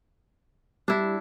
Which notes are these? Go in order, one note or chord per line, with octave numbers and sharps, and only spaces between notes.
G3 D4 E4